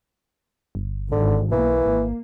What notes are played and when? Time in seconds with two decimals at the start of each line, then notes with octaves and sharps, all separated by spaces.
0.75 G1
1.12 G#1 D3
1.52 B1 E3 A#3
1.86 G#1